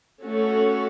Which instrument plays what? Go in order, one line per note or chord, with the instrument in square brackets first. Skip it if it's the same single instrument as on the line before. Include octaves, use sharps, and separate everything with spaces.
[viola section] A3 C#4 F#4 A4 C#5